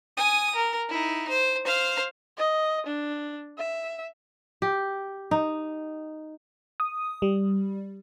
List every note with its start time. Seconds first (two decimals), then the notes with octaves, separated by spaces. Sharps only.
0.17 G#5 D#6
0.55 A#4
0.89 D#4 E4
1.29 C5
1.65 C5 F5
2.37 D#5
2.86 D4
3.58 E5
4.62 G4
5.31 D#4
6.80 D#6
7.22 G3